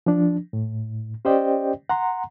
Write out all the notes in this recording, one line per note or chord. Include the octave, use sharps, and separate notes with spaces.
F3 D4
A2
C#4 G4 C5 D5 D#5 G5
F#5 A#5 C6